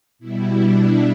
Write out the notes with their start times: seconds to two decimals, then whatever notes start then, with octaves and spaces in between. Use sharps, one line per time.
0.19 B2 G3 E4
0.59 D4